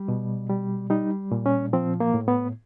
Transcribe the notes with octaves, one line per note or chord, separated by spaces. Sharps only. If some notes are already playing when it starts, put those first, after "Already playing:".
Already playing: G3
B2
G3
G3 D#4
A#2
C#4
F3 C4
A#3
A2
B3